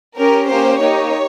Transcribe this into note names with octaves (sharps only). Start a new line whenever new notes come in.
C#4 G4 A#4
A#3 C#4 G4 C5
A#3 D#4 G4 C#5